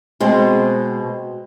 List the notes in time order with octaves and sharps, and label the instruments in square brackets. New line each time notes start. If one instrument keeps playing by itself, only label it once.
[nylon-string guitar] B2 G#3 C4